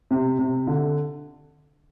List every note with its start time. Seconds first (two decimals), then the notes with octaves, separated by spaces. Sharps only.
0.11 C3
0.39 C3
0.67 D3